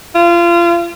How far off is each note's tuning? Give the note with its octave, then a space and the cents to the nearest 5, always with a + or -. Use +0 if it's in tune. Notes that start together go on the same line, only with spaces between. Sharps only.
F4 -30